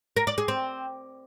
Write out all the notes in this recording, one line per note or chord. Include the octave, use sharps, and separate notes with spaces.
A#4
D5
G#4
C4